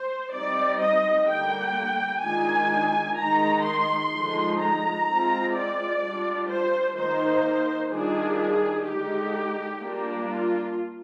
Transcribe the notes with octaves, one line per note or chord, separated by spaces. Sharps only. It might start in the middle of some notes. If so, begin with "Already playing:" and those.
Already playing: C5
G3 C4 D#4 D5
D#5
D3 G3 A#3 G5
D#3 G#3 D4 F4 G#5
D#3 G#3 D#4 A#5
C6
D3 F3 G#3 D#4
A#5
G#3 C4 F4
D5
G3 D4 F4
C5
D#3 A#3 D#4 C5
D#3 G3 D4 F4 G#4
D3 G#3 D#4 G4
G3 A#3 D4 F4
F4